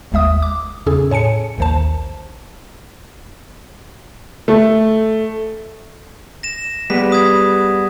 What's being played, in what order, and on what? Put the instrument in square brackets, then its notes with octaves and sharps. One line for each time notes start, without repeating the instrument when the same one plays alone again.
[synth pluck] G1 D#2 G#3 E5 D#6
D6
E2 C#3 C#4 G#4 A4
A2 C#5 G#5 A5 C#7
A#1 D#2 D#3 C5 A5
[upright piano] A3
[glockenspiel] A#6 E7
[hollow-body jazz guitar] G3 G#3 B3 [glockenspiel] B6
[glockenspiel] D#6 G#6